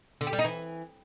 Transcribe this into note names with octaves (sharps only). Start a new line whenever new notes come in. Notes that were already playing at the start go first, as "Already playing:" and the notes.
D3
G4
G3
D#4
E3